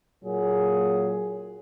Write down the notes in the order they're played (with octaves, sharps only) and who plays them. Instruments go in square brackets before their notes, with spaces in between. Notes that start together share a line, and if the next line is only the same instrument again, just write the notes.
[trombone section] A#2 F#3 A#3 G#4